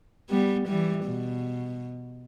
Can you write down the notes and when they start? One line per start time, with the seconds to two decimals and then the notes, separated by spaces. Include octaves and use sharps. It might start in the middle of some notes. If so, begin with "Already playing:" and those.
0.30 G3 B3
0.68 E3 G3
1.05 B2